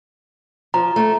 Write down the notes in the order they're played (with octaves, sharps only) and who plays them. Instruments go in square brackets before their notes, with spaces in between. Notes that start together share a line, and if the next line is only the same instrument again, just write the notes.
[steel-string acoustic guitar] F3 [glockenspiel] A#5
[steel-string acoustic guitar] A3